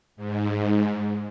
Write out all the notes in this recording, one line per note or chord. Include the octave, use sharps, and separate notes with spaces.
G#2